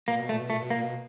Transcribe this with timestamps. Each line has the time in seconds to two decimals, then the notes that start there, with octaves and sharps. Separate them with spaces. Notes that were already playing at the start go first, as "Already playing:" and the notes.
0.08 A#2 A#3
0.19 B2
0.29 A#2 A3
0.40 B2
0.50 A#2 A3
0.62 B2
0.70 A#2 A#3
0.83 B2